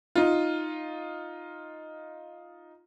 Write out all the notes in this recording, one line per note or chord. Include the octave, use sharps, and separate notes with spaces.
D#4 F4